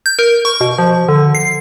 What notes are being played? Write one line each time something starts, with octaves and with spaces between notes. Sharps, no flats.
G6
A#4
C#6
B2
F3
D3
C7